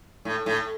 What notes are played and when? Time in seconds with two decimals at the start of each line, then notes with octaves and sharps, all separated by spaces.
0.25 A2
0.46 A2